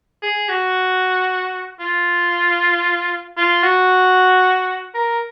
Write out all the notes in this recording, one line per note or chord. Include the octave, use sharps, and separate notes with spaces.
G#4
F#4
F4
F4
F#4
A#4